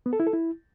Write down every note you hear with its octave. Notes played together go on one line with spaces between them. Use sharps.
B3
A4
E4
A4
E4